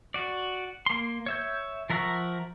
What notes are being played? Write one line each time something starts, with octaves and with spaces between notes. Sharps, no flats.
F#4 D5
A#3 C6
C#5 E5 G6
F3 A#4 E5 F#5 C#6